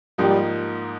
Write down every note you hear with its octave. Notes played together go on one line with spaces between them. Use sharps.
G#2 F3 G3 A#3 D#4